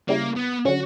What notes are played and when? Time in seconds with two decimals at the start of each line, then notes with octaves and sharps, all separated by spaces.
0.09 C#3 G3 A#3 C#4 E4
0.36 B3
0.65 D3 F#3 C#4 F#4